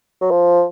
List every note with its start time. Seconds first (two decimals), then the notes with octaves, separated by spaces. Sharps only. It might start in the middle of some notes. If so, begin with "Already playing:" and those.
0.21 F#3
0.31 F3